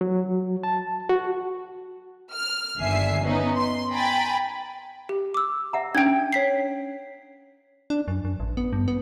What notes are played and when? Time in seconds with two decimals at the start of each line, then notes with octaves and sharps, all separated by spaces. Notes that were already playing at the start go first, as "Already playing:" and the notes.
0.01 F#3
0.63 A5
1.09 F#4
2.33 F6
2.78 G1 D#2 D3 E5 G#5 C7
3.23 B3 C#4 D#4
3.56 C6
3.92 G5 G#5 A#5 B5 A6
5.09 G4
5.34 D6 E6
5.73 E5 F#5 A#5
5.95 C#4 D4 G5 G#6
6.33 C#5 B6 C7
7.90 D4
8.08 F#2
8.25 F#2
8.40 A1
8.57 B3
8.73 G2
8.88 B3